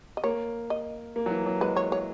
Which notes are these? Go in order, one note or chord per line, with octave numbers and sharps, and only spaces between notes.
D#5
A#3 C#5
D#5
A#3
F#3
E3
F#3
G#3 B4
C#5
C#5